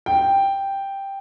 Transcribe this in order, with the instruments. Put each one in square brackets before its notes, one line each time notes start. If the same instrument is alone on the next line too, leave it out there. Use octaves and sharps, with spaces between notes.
[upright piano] G5